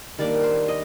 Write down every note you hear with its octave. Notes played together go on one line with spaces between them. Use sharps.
D#3 G3 A#3 D4 D5
C5
D#5